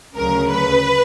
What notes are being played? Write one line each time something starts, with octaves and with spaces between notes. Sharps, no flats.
D2 C#3 F#3 A#4
B4